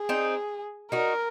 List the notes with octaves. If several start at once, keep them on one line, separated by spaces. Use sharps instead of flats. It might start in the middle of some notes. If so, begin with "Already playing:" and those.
Already playing: G#4
C4 D#4
D#4 F#4 A#4